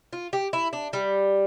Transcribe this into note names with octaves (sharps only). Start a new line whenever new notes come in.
F4
G4
E4
D4
G3